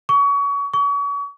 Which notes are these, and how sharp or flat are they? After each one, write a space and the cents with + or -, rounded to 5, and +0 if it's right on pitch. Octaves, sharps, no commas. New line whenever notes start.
C#6 +30
C#6 +40